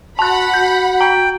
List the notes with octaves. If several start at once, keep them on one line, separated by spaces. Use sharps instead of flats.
F#4 F#5 A5 B5 F#6
F#4 G6
G5 A#5